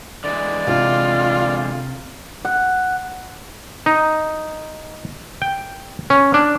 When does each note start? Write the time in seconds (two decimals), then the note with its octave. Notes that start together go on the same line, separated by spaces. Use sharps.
0.24 D3 E3 G#3 D5
0.67 C3 F4 F5
2.45 F#5
3.86 D#4
5.42 G5
6.10 C#4
6.34 D4